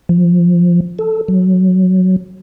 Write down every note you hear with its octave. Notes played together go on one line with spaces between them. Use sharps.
F3
A4
F#3